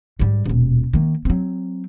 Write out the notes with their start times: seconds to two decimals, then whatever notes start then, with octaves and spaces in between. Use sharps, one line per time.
0.19 G#2 G3
0.46 D#1 B2
0.93 D#3 A#3
1.25 F#3 C4